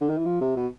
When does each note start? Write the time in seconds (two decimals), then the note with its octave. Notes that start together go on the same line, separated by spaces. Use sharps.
0.01 D3
0.09 D#3
0.18 E3
0.25 F3
0.41 C3
0.56 B2